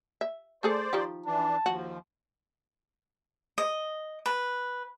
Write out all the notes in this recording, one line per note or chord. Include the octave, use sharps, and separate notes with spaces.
E5
A3 G#4 A4 C5 D5
D#3 F3 G4
E3 D4 A5
D#2 F3 F#4
D#5
B4